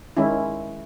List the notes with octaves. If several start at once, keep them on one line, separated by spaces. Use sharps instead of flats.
D#3 G#3 C#4 E4